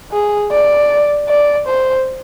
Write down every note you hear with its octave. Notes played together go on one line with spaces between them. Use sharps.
G#4
D5
D5
C5